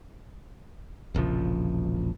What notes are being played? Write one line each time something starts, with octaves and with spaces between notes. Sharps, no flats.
E1 A#1 C#3 F3